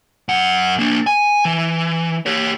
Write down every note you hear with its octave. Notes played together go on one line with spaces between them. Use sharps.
F#2 F#5
A#3 D4
G#5
E3
G4 C#5